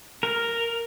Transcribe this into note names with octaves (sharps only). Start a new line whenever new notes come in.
A#4